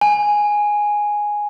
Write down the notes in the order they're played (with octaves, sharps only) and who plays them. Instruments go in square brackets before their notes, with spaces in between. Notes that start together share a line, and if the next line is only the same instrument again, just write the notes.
[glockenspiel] G#5